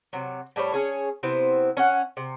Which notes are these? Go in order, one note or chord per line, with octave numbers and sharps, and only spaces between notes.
C3 F#3
A2 G3 C5 C#5
C#4 G#4 C#5
C3 B3 C4 E4
C#4 C#5 F#5
C3